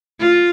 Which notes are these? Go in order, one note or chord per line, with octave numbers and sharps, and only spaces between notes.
F4